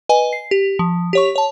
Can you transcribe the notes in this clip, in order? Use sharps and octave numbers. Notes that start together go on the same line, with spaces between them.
B4 D#5 G#5
C7
G4
F3
G4 C#5 C#6
C#5 A5